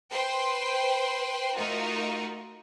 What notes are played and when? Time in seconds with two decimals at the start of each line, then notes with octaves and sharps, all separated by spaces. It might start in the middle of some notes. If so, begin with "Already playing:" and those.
0.12 B4 C5 G5 C6
1.57 A3 D#4 F4 F#4 A#4